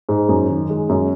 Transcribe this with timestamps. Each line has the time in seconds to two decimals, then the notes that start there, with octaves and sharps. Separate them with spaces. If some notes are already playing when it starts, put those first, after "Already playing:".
0.09 G#2
0.29 F#2
0.49 D#3
0.70 G#3
0.89 F#2